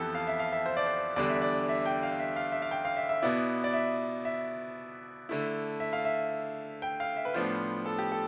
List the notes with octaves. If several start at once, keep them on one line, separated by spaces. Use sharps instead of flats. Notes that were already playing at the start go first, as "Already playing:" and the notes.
Already playing: F2 E3 B3 G4 A4
F5
E5
F5
E5
C5
D5
C5
E2 D3 G3 D4 D5
E5
D5
E5
G5
F5
E5
F5
E5
F5
G5
F5
E5
E5
B2 B3 E4 D5
D5
E5
E5
D3 A3 E4
E5
F5
E5
G5
F5
E5
B4
A2 F3 B3 D4 F4 C5
A4
G4
A4